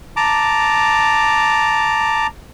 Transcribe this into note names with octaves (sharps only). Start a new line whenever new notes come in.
A5 A#5 D6